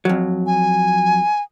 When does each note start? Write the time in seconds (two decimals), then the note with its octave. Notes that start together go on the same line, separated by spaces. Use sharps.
0.05 F2 F#3
0.47 G#5